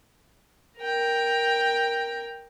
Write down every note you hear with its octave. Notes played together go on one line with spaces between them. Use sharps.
A#4 G5